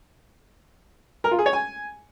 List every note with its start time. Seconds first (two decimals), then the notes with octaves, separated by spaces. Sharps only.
1.24 A#4
1.31 F4
1.39 G#4
1.46 C#5
1.53 G#5